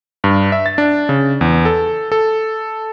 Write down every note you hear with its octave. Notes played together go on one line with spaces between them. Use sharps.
G2
E5
A6
D4
C#3
E2
A4
A4